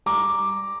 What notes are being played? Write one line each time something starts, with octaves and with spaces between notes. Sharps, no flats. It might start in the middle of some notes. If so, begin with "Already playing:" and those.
G3 A#5 D6